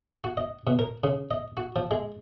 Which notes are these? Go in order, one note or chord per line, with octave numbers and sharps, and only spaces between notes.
F#4
D#5
B2
A#4
C#3
D#5
F#4
F3
G#3